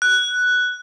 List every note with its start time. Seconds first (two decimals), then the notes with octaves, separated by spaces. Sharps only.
0.02 F#6